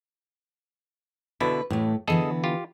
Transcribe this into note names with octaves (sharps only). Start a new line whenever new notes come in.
B2 D3 E4 B4
A1 A2 A3
D3 E3 B3 G#4 A4 D#5
F4 G4